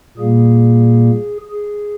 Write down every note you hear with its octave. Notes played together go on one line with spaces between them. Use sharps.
A#2 G3 A#3 G#4
G#4